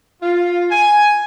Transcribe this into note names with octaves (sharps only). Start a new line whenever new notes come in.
F4
G#5